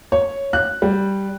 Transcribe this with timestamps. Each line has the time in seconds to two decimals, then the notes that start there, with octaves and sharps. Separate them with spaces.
0.12 C#5
0.53 F#6
0.82 G3